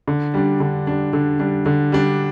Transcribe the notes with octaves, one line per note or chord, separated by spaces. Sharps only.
D3
G3 D4
D3
G3 D4
D3
G3 D4
D3
G3 D4